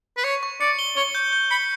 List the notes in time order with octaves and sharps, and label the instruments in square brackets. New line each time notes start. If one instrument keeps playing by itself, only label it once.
[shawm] B4
[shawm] C#5 [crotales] C#6
[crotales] C#6
[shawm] D5 [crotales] C#7
[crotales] G7
[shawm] C#5 [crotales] G7
[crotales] G6
G6
[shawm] B5 [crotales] C#7